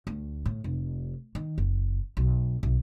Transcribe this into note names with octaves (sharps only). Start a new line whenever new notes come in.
D2
A2
F1
D#3
F#1
B1
B1